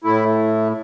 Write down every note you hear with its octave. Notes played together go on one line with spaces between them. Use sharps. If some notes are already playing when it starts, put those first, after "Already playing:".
A2 A3 E4